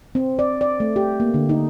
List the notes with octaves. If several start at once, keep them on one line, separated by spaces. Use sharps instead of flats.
C4
D5
D5
A3
G4
A#3
D3
D#4